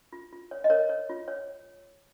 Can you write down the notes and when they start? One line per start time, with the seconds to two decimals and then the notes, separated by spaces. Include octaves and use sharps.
0.13 F4
0.33 F4
0.51 C#5
0.64 D#5
0.70 A#4 C#5
0.89 C#5
1.10 F4
1.28 C#5